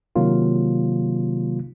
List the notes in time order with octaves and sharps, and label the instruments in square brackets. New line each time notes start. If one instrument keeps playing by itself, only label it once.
[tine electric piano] C3 D#3 F#3 A#3 F4